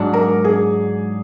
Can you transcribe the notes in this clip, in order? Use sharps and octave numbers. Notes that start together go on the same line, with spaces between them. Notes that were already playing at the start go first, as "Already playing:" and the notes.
Already playing: G#2 F#3 D4
A#4
G#4